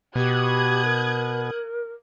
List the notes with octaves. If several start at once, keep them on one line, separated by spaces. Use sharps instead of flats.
B2 G4 D#6 F#6 G#6
A#4